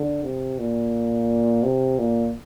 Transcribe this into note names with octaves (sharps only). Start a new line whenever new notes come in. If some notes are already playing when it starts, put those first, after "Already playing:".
Already playing: D3
C3
A#2
C3
A#2